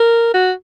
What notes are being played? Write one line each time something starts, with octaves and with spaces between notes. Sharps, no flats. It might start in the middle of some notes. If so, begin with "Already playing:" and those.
Already playing: A#4
F#4